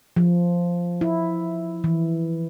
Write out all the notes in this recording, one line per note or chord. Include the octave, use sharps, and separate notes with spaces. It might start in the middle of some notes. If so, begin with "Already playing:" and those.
F3
E4
E3